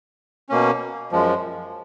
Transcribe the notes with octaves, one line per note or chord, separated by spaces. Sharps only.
B2 A#3 C#4
F#2 F3 G#3